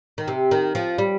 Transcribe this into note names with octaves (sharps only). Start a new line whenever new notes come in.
D#3
C3
D#3
F3
G3